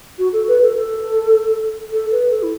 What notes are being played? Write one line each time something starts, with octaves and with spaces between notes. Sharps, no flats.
F#4
A4
B4
A4
A4
A4
B4
A4
E4